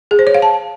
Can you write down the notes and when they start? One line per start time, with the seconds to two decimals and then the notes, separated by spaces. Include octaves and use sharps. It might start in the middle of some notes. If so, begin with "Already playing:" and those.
0.11 G#4
0.19 C5
0.27 C#5
0.35 F5
0.42 A5